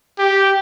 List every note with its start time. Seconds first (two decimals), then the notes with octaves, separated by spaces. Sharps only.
0.19 G4